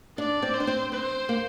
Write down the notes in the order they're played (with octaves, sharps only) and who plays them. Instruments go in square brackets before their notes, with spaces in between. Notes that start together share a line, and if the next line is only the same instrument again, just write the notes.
[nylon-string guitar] D4 [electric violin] D5
[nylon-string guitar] C4
[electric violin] C5
[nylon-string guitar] D4
C4
[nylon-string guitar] C4 [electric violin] C5
[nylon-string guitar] A#3